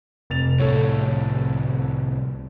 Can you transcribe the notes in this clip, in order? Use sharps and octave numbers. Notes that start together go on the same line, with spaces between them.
F1 A6 F7
C2 A2 A4 C#5